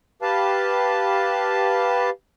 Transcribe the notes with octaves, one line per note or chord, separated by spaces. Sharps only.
G4 B4 F5 A5